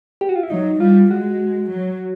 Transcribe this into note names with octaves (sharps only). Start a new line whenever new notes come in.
G4
F#4
F4
E4
F#3 D#4
G3 F4
G#3 F#4
F#3